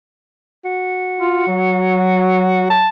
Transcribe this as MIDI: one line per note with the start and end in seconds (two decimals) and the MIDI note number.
0.65 2.69 66
1.21 1.45 65
1.47 2.87 54
2.70 2.89 81